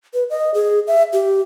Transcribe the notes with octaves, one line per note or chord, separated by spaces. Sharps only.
B4
D#5
G#4
E5
G4